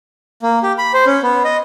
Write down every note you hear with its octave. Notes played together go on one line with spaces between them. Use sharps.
A#3
G4
B5
C5
C#4
B3
D#5